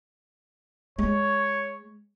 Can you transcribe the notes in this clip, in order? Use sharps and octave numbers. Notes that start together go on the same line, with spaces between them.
G#3 C#5